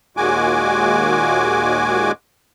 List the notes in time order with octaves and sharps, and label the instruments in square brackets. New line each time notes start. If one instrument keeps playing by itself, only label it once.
[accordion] D#2 A#2 G#3 F#4 G#5 D6